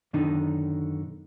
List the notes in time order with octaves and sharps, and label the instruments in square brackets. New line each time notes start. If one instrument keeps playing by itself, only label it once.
[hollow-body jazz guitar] F#2 B2 D3 D#3 D4 D#4